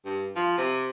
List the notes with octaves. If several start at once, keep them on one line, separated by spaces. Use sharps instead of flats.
G2
F3
C3